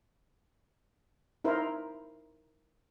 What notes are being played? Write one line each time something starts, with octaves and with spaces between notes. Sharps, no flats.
D#4 E4 A#4 C5